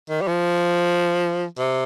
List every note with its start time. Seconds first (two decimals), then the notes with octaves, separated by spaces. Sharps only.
0.09 D#3
0.21 G3
0.28 F3
1.58 C3